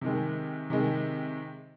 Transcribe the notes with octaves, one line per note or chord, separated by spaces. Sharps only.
C3 D#3 G#3
C3 D#3 G#3